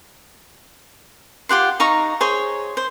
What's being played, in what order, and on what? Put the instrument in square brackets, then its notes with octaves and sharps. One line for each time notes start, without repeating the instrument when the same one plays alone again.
[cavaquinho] F4 G4 F#5 C6
D#4 F5 A#5 C#6
G#4 C5 C#5
C5